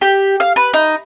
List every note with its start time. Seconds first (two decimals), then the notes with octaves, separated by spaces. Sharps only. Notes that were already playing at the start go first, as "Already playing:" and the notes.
0.01 G4
0.40 F5
0.56 B4
0.74 D#4